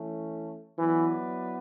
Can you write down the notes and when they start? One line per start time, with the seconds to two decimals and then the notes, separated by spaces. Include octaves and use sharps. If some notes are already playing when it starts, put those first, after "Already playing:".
Already playing: E3 A3 C#4
0.78 E3 F#3 B3 E4 B4 D5